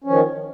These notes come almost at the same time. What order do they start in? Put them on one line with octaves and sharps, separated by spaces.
C#4 F3 D#3